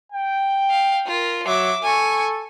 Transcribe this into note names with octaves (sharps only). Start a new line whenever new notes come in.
G5
F5
F4 A#4
F#3 E5 D6
A4 G#5 C#6